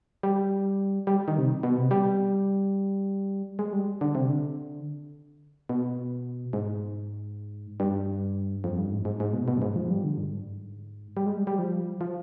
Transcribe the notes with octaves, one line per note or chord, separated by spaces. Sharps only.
G3
G3
D#3
C3
B2
C3
G3
G#3
G3
D3
C3
D3
B2
G#2
G2
F2
G2
G#2
G#2
G#2
B2
B2
G2
G#2
F3
G3
D3
G2
G#2
G3
G#3
G3
G3
F3
F3